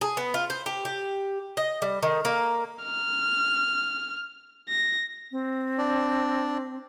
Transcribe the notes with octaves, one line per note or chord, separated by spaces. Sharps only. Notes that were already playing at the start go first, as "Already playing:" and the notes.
G#4
B3
F4
C5
G4
G4
D#5
G3
D#3
A#3
F6
A#6
C4
D4 D5